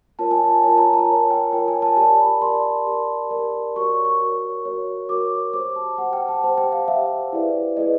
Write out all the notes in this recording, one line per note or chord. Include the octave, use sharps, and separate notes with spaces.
F4 A#4 C#5 A5
G#5
A5
F4 A#4 C#5 A5
A#5
A5
F4 A#4 C#5
G5
F4 A#4 C#5 G5
G#5
A5
G4 A#4 D5 A5
B5
G4 A#4 D5 C6
G4 A#4 D5
G4 A#4 D5
F#4 A#4 C#5 C#6
C#6
C#6
F#4 A#4 C#5
F#4 A#4 C#5
F#4 A#4 C#5 D6
G4 C5 D6
A5
G4 C5 F#5
G5
A5
G4 C5 A5
G5
F5
G4 C5 E5
E4 G#4 B4 D5
E4 G#4 B4 D5 D#5